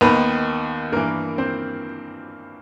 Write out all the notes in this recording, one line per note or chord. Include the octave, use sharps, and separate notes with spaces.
D#2 D#3 B3 B4
G2 E3 A#3 A#4
C4 C5